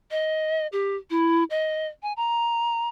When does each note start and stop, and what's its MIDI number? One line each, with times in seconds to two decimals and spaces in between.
0.11 0.67 75
0.72 0.96 67
1.10 1.44 64
1.50 1.87 75
2.02 2.13 80
2.17 2.89 82